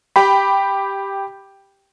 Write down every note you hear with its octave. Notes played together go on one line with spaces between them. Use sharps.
G4 G5 B5